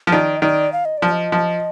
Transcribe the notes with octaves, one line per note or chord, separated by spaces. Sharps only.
F3
D#3 D5
D#5
D#3 D5
F5
D#5
F3 D5
D#5
F3